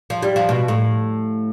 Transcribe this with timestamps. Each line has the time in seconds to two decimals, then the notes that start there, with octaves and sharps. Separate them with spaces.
0.10 F3
0.23 G3
0.36 F3
0.49 B2
0.68 A2